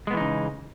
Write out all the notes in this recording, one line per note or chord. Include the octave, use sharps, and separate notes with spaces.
C#3 E3 G#3 B3 D#4